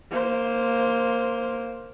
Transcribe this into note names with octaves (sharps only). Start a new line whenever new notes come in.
A#3 C5